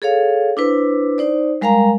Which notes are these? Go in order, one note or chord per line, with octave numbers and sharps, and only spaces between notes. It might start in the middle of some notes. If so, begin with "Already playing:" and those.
G#4 A4 C#5 F5
D4 E4 B4 C5
D#4 C5 D5
G3 G#3 A#4 F5 G#5 A#5